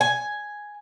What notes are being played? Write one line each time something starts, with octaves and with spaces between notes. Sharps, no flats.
G#5